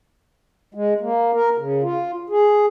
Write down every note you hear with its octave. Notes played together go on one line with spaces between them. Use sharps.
G#3
A#3
A#4
C#3
F4
G#4